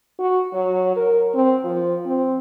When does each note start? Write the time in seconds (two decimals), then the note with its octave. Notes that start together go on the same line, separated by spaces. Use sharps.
0.19 F#4
0.53 F#3
0.96 A#4
1.35 C4
1.64 F3
2.06 C4